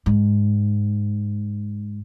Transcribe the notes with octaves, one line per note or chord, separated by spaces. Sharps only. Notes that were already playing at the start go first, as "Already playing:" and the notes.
G#2